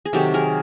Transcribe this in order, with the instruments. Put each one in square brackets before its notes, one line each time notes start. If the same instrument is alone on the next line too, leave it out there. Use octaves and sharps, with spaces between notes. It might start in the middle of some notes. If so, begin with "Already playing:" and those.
[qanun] G#4
C3 D#3 F#3 G4 A4
G#4 A#4